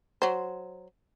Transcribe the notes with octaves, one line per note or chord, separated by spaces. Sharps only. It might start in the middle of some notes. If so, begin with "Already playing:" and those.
F#3 C5